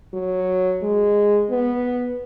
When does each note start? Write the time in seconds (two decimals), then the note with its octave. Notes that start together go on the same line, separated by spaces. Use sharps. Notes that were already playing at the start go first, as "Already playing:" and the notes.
0.13 F#3
0.82 G#3
1.50 B3